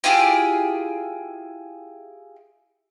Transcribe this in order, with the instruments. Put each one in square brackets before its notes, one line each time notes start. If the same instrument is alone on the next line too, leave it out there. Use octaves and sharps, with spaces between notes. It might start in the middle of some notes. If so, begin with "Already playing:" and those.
[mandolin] E4 F4 G4 G#4